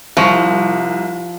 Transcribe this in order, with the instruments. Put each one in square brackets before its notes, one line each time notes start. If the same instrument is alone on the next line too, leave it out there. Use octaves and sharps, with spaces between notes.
[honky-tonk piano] C2 [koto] F3 [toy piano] E5 G#5 C#6